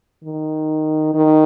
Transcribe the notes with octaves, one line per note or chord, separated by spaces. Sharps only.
D#3
D#3